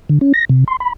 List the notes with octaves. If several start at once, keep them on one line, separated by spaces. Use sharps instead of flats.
D3
C#4
A#6
C3
C6
B5